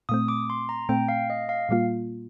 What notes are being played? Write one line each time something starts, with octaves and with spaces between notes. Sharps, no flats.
A#2 A3 C4 D#6
D6
C6
A#5
A#2 A3 C4 G5
F5
D#5
F5
A#2 G3 A#3 F4